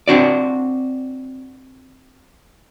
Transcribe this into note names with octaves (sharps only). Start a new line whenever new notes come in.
C4 D4 F#4 D5